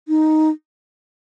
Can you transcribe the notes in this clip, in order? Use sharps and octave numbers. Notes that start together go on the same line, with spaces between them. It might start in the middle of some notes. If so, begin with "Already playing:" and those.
D#4